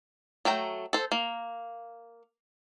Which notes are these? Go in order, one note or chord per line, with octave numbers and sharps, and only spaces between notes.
F#3 A3 G5 A#5
A4 C5
A#3